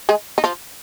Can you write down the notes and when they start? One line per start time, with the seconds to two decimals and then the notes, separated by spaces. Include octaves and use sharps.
0.09 G#3 G#4
0.38 D#4
0.44 F3 F4